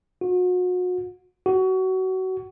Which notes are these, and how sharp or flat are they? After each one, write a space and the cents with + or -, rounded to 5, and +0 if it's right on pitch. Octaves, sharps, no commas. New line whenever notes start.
F#4 -35
F#4 +25